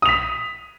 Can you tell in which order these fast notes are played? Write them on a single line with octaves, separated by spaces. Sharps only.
D#6 F7 B6